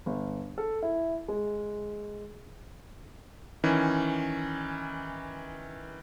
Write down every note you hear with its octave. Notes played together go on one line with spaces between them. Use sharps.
G1
A4
E4
G#3
D#3 E3 C#4